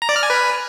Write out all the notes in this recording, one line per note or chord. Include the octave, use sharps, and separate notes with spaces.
A#5
D5
F6
G#5
B4